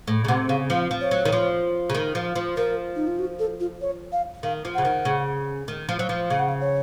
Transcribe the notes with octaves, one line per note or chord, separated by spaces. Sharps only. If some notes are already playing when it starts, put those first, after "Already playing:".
A2
C#3
C3 F#5
C#3 F5
F3 F5
F3
C#5
F#3
D#3
F3
C#3
D#3
F3
F3
F3 A#4
D#4
F4
F#4
A4
F4
C#5
F5
D#3 F5
F3
C#3 F#5
D#3
C#3
D#3
F3
F#3
F3
C#3 F5
F#5
F5
C#5